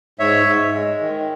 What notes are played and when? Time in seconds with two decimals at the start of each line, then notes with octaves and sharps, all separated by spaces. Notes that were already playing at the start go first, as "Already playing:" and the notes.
0.19 G#2 C#5 E5
0.47 G#2
0.74 G#3
1.01 D#3